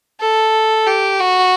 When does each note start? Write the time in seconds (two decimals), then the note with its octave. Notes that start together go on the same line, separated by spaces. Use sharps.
0.20 A4
0.86 G4
1.20 F#4